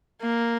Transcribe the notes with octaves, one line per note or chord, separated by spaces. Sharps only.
A#3